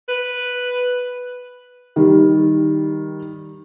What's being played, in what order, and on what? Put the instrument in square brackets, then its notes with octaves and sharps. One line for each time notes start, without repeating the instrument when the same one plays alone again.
[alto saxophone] B4
[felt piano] D#3 G3